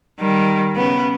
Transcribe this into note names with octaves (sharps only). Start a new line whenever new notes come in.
D#3 G3
C#3 B3